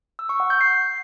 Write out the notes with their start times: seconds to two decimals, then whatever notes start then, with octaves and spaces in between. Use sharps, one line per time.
0.19 E6
0.29 C#6
0.40 F#5
0.50 G6
0.61 C7